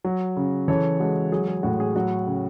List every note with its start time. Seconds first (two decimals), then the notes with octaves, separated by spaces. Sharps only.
0.04 F#3
0.37 C#3
0.68 E3 A4 C#5
1.00 G#3 F#4 A4
1.32 F#3 G#4
1.48 G#4
1.63 A2 F#4
1.80 G#4
1.96 F#3 F#4
2.27 C#3